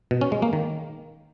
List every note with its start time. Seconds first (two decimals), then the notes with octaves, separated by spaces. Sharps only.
0.11 B2
0.21 C#4
0.32 G#3
0.42 A#3
0.53 D#3